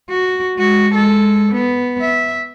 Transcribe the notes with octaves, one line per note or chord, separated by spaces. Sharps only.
F#4
G#3 F#4
G#3 A4
B3
E5